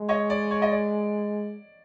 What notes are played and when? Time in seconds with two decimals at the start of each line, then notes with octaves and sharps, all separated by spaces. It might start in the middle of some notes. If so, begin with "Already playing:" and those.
Already playing: G#3
0.09 C#5 D#5
0.30 D5
0.51 C#5
0.62 D#5
0.72 D5